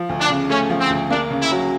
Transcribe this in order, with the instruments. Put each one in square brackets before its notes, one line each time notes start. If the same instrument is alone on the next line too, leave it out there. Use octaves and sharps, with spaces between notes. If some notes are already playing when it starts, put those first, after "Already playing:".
Already playing: [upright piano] F3
D2
[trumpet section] D4
[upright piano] C#3
[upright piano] A3 [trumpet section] C#4
[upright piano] F3
[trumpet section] C4
[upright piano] D2
[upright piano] A#3 [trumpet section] D4
[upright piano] C#3
[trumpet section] E4
[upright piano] F#3